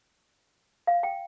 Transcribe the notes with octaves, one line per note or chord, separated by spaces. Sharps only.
F5
G5